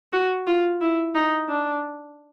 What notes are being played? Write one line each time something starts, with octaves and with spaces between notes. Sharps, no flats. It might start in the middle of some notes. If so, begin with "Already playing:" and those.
F#4
F4
E4
D#4
D4